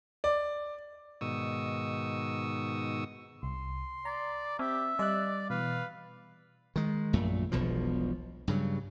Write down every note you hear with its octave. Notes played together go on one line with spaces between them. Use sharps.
D5
G#2 B2 D#3 C#6 D#6 E6
C2 C6
D5 A#5
C4 G4 E5
G3 D5 D#5 F#6
B2 E3 B4 F5
D#3 G#3
A#1 F#2 A#2 A3
E1 B1 B2 F3
G2 C#3 F#3